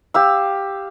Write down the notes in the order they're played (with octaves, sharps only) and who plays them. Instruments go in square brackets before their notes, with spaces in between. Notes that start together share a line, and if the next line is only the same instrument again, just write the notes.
[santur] G4 F5 E6